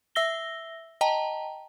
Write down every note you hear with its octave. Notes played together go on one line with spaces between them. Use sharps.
E5 E6 A#6 G7
D#5 G5 A5 A#5